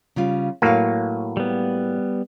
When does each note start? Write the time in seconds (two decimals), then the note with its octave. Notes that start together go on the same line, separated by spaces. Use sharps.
0.16 C#3 G3 F4
0.62 A2 F#3 A#3 B4 F5
1.37 G3 B3